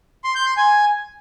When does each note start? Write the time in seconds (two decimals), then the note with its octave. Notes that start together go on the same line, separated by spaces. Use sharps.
0.24 C6
0.35 G6
0.46 C6
0.57 G#5